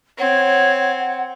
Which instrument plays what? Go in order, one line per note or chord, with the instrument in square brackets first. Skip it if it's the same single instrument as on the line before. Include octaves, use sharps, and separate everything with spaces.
[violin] C4 [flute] C#5 [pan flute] F#5